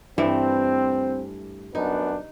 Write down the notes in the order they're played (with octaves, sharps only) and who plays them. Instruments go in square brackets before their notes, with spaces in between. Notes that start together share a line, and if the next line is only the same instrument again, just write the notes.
[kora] G2 E3 A3 [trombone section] C4
[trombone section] F#2 B3 D4 [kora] D#4